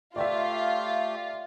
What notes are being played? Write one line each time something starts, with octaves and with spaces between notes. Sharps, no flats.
A3 F4 G4 D5 E5